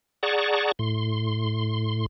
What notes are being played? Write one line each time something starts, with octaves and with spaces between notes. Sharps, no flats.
G#4 D5 F#5 A5 A#5 C#6
A2 C6